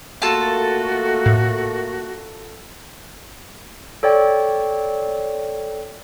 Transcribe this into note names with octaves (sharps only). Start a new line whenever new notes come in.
A3 A#3 F4 F#4 A4 A5
A2
A4 C#5 D5 G5